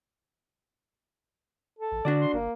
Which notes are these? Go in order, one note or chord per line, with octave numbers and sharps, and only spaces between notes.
A4
A1
D3 D4 F#4 D5
C6
G1 A#3